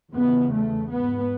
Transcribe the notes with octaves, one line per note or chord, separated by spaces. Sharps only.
E2 C#3 B3
A3
G#2 B3